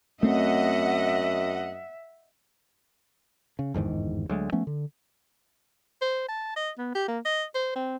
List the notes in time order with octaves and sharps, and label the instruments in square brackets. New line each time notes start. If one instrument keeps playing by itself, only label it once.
[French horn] F#2 [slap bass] A3 C4 [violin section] D#5 F#5 [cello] E5
[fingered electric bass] C#3
G1 E2 G#2 D#3
D2 F#3 G#3
F3 A3 B3 C#4
D3
[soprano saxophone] C5
A5
D#5
B3
G4
A#3
D#5
C5
C4